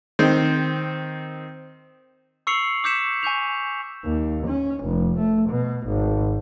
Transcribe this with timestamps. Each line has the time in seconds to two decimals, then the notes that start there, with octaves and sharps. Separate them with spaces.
0.19 D#3 C4 C5
2.47 C#6 E6 C7 C#7 F7 F#7
2.84 D6 E6 G6 B6 C#7 E7
3.23 G#5 C#6 G6 F7
4.05 D#2
4.47 C#4
4.85 F1
5.19 A3
5.50 B2
5.87 G#1